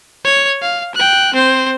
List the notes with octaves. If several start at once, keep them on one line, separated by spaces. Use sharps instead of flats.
C#5
F5
G5 F#6
C4 C5